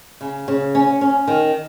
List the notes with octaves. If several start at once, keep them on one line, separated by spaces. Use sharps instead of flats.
C#3
C#3
C#4
C#4
D#3